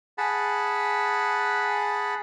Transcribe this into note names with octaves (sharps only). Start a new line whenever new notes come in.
G#4 F#5 A5 B5